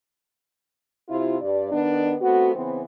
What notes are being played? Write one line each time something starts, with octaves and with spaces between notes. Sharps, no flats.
C3 E4 F4
G2 D5
D#3 B3 D4
A3 B3 C4 F#4
C#3 E3 B3 C4